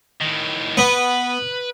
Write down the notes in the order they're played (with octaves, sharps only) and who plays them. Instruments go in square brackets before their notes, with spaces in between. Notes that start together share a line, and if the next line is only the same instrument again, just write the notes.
[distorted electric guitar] A2 D#3
[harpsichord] B3 [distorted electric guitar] B4